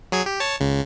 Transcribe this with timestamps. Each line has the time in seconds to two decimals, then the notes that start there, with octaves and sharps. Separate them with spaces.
0.12 F#3 G#4 G#6
0.26 G4
0.40 C#5 A5
0.60 C#2 C#3